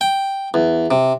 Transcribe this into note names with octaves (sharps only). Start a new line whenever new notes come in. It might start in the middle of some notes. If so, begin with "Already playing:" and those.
G5
E2
C3